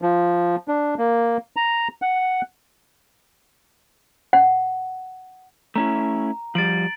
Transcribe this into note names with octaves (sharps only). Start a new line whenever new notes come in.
F3
D4
A#3
A#5
F#5
F#5
A3 C#4 E4 A#5
F3 G3 A6 D7 F#7